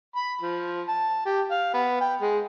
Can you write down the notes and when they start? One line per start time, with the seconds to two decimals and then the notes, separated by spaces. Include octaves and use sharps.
0.16 B5
0.41 F3
0.88 A5
1.26 G4
1.51 F5
1.74 B3
2.01 G5
2.21 G#3